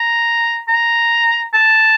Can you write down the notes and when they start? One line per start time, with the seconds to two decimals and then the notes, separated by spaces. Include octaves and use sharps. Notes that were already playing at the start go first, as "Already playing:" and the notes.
Already playing: A#5
0.69 A#5
1.54 A5